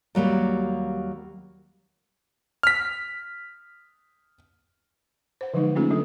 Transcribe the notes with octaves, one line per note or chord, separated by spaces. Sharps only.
D#2 F#3 G3 A#3
F6 B6
C5 F#5
D3 F3 F#3 G#3 D#4
A3 A#3 C#4 D#4 F4 G#4
D3 F#3 D4 A4